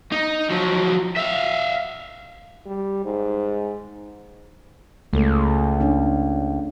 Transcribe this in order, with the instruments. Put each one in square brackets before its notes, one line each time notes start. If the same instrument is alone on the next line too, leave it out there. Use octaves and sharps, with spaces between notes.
[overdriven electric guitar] D#4
F3 F#3
E5 F5
[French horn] G3
G#2
[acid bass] C#2 [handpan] G#3 A3 A4
[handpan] C#4 D4